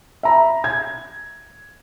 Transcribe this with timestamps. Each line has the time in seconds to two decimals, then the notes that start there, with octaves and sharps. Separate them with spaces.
0.23 E5 A#5 B5
0.64 G#6